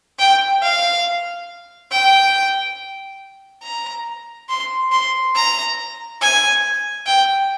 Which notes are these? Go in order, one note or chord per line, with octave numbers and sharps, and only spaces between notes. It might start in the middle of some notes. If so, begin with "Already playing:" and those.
G5
F5
G5
A#5
C6
C6
A#5
G#5
G5